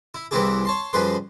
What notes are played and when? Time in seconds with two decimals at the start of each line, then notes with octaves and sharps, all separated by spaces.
0.14 E4
0.31 C2 E3 C4 E4 G4 G#4
0.65 C#5 A5 C6
0.93 F#2 F3 G3 G#4 B4 C6